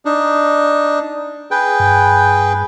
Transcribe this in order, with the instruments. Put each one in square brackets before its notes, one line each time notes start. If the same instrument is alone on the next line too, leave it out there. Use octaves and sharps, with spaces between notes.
[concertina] D4 D#4
G#4 B4 G5
[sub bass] G2